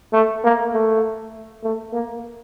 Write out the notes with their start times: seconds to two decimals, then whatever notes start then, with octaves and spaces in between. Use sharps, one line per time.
0.13 A3
0.44 A#3
0.74 A3
1.63 A3
1.93 A#3